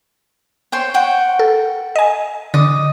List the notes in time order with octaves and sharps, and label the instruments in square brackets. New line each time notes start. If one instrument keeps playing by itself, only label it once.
[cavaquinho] C5 C#5 G5
F#5 G5 C#6
[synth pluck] A4
D#5 G#5
[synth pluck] D3 [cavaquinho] D#5 D6